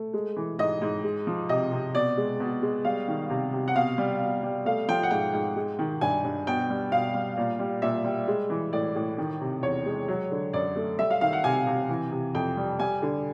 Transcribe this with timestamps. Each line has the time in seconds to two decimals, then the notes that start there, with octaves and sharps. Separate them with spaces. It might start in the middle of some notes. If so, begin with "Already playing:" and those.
Already playing: A3
0.14 G#3
0.36 E3
0.59 G#2 D#5
0.82 G#2
1.04 G#3
1.27 F3
1.49 C3 D#5
1.72 C3
1.94 B2 D5
2.17 G#3
2.40 B2
2.62 G#3
2.85 G3 F5
3.08 D#3
3.30 C3
3.53 C3
3.68 F#5
3.76 B2 F5
3.98 G3
4.20 B2
4.43 G3
4.66 A3 F5
4.88 F3 G5
5.03 F#5
5.11 G#2 G5
5.33 G#2
5.56 G#3
5.79 D#3
6.01 G2 G#5
6.24 G2
6.47 B2 G5
6.70 G3
6.92 B2 F5
7.14 G3
7.37 A#2
7.59 G3
7.82 A#2 E5
8.05 G3
8.28 G#3
8.50 E3
8.73 A2 D5
8.95 A2
9.18 D#3
9.41 C3
9.63 E2 C#5
9.86 G#3
10.08 F#3
10.31 D3
10.53 F#2 D5
10.76 A3
10.98 G3 E5
11.11 F5
11.21 D#3 F5
11.33 F#5
11.44 C3 G#5
11.67 C3
11.89 E3
12.12 C3
12.34 F2 G5
12.57 G3
12.79 G3 G#5
13.02 D3